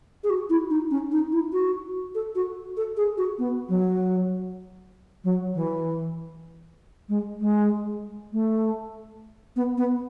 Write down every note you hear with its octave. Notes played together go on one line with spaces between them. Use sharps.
G#4
F#4
E4
D#4
C#4
D#4
E4
F#4
A4
F#4
A4
G#4
F#4
B3
F#3
F#3
E3
G#3
G#3
A3
B3
B3